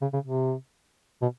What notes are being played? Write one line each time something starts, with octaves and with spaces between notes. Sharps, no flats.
C#3
C#3
C3
B2